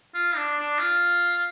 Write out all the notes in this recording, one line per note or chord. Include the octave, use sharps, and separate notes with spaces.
F4
D4
D4
F4